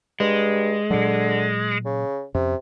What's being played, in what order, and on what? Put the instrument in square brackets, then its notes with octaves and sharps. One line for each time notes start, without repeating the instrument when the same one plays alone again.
[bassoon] G2 [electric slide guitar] G#3
[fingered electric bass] A#2 F#3 [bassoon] D3
[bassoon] C#3
[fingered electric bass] F2 C#4 [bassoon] C3